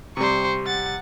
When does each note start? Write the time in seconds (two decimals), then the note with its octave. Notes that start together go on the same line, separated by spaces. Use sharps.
0.17 C3 G3 C5 C#6
0.66 F#5 A6